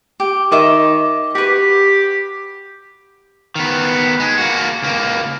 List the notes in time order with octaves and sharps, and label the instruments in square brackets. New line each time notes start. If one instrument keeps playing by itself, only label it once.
[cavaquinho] G4
[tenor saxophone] D#3 [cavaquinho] D#5 E5 D6
[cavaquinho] F#4 B4 [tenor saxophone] G4
[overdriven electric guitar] D#3 B3
G#3
A#3 F#4
C#2 A#3